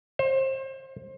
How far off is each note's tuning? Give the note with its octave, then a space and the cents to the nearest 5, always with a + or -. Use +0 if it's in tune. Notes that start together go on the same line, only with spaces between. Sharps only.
C5 +30